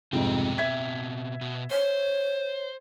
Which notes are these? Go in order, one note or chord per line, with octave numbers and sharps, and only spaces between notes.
C2 F2 G#2 B2 C4 G5
E5 G#6 B6
B2
C5 C#5